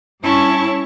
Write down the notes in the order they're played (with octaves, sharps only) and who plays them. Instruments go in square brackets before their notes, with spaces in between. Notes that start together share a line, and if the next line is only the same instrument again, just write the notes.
[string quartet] G2 C#4 E4 C#5 A5 C#6